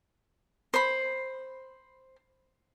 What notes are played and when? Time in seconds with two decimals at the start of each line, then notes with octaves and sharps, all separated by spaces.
0.74 C5 B5